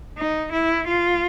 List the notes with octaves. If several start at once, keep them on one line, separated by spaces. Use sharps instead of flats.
D#4
E4
F4